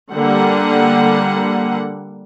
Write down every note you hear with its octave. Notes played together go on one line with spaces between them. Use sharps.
D3 G3 A#3 F#5